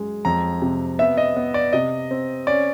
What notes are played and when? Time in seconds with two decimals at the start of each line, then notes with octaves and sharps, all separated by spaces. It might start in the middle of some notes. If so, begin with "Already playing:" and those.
Already playing: F#2 G#3
0.25 F2 A#5
0.62 C3
0.99 B3 E5
1.17 D#5
1.36 B3
1.54 D5
1.73 C3 D#5
2.11 C4
2.47 C#4 D5